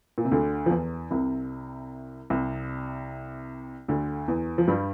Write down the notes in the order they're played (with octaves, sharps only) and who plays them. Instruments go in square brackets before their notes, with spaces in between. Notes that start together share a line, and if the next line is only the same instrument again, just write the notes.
[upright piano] A#2
C3
D2 D3
F3
E2 E3
C2 C3
C2 C3
D2 D3
E2 E3
F3
G2 G3